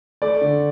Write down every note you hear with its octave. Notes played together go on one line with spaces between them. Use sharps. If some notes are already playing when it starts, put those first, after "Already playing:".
A3 D5
D3